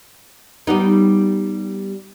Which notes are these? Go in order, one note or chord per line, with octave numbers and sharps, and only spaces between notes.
G3 B3 D#4